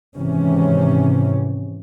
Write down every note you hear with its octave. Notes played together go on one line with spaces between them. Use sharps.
G#1 G#2 C3 E3 C#4